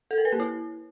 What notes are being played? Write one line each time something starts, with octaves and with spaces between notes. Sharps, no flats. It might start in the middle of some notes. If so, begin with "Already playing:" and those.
A4
A#4
B4
A#3
E4